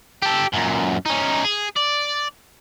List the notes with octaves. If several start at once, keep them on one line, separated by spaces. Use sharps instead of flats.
G4 A4
F#2 A#2
C#4 D#4
G#4
D5